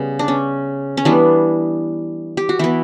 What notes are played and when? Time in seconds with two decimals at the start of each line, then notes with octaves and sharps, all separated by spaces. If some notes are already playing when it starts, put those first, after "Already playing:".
Already playing: C#3 G3 B3
0.19 D4
0.28 C#4
0.97 C#4
1.05 E3 G3 B3 D4
2.37 G4
2.49 F#4
2.59 E3 B3 E4